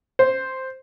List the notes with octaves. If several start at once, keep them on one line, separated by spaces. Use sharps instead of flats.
C5